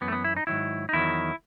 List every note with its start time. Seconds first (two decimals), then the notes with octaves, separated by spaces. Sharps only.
0.01 F#2 E3 B3
0.08 A3
0.12 B3
0.24 E4
0.37 D#4
0.47 G#2 D#3 F#3 E4
0.89 D#4
0.93 E2 D#3 F#3 E4